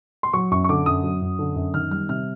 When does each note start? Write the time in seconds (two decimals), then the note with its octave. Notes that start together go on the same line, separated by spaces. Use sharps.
0.23 C6
0.33 F#3 C#6
0.51 F#2 C#6
0.64 C#6
0.69 D3 D6
0.86 F#2 D#6
1.04 F#3
1.22 F#2
1.39 D3
1.56 F#2
1.74 D#3 F6
1.91 G3 F6
2.09 C3 F6